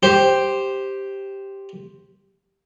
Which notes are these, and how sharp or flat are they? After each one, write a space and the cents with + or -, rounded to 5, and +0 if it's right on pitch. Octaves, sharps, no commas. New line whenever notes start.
G4 +0 C5 +0